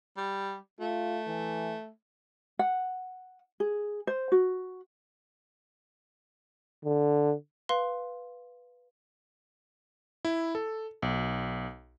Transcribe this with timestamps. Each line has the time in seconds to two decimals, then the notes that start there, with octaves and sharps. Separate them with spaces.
0.17 G3
0.80 A3 F4
1.28 E3
2.59 F#5
3.60 G#4
4.07 C5
4.32 F#4
6.85 D3
7.69 B4 F5 C6
10.25 E4
10.55 A4
11.02 B1